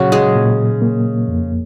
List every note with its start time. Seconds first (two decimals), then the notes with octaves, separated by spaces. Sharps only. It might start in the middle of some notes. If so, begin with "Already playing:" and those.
Already playing: A#2 C#3 F#3 C#4 F#4
0.12 G#3 G#4
0.36 A#2
0.82 A#3
1.28 F2